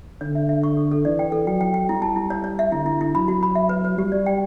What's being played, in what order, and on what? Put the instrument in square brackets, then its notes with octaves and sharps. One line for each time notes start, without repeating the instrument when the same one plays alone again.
[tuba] D3 [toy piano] C#5
[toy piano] E5
E5
C#6
A4
A4
[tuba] E3 [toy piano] D5
[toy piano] G5
A4
[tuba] F#3 [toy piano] G5
[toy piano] G5
G5
[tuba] G3 [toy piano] E4
[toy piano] A5
E4
C#5
C#5
E5
[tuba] D3 [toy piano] E4
[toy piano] E4
E4
[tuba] F#3 [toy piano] B5
[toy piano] F#4
B5
E5
B4
B4
[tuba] G3 [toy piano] G4
[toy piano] D5
G5